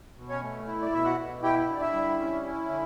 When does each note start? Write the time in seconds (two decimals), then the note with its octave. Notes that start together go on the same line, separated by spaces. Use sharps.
0.17 B2
0.29 C#4 C#5
0.42 A3
0.67 E4
0.82 D5
0.93 B2 E5
1.05 F#4 F#5
1.18 B2
1.43 E4 G4 G5
1.68 D3
1.75 D5
1.81 E4 E5
1.93 G3
2.20 C#4
2.44 E4
2.69 D3